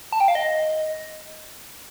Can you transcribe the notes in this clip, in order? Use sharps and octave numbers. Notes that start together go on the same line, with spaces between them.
A5
G5
F5
D#5